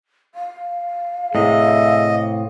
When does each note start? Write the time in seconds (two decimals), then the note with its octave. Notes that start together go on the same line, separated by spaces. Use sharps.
0.35 F5
1.35 A2 C3 G#4 D#5 E5